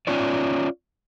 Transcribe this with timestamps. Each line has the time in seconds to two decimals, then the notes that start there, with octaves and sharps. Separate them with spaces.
0.07 C#4 F4 C#5 D5